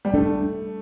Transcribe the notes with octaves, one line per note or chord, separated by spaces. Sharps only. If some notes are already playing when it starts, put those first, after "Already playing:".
G3
A3 D4